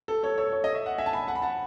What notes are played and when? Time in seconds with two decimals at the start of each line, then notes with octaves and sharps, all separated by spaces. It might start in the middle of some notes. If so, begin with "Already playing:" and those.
0.08 A4
0.23 A4 C#5
0.38 A4 C#5
0.53 C#5
0.64 D#5
0.75 E5
0.86 F#5
0.98 E5 G#5
1.06 A5
1.13 G#5 B5
1.28 F#5 A5
1.35 B5
1.42 F#5 A5